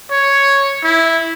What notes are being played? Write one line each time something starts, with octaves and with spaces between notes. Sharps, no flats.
C#5
E4